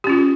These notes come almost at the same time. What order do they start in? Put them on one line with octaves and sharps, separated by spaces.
G4 C#4 F4